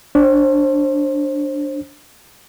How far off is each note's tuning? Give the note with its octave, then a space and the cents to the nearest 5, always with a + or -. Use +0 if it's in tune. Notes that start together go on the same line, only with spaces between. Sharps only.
D4 +0 C5 +30